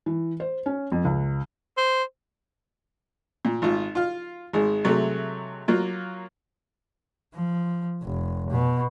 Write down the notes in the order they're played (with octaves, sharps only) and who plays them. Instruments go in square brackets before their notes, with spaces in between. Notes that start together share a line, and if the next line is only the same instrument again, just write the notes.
[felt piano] E3
C5
C#4
F2
C#2
[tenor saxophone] C5
[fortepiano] A#2
G#1 F4
F4 F5
G#1 G#3
C3 F#3 G#3 A3
F#3 A#3 F4
[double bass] F3
F1
B2